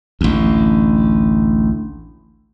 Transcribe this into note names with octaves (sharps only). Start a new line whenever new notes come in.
A1 D2